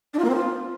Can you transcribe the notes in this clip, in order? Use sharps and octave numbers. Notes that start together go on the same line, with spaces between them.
D4
F4
A#3
C4
F4